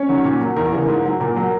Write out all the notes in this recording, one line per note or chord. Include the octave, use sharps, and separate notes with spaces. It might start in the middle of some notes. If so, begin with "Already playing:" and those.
Already playing: C#4 C#5
D#3 F#3
A#2
F#3
E2 A#4
C#3 E3
G#2
F#3
A#2 A#4
F#3